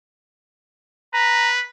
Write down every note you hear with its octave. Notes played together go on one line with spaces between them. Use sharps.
B4 A#5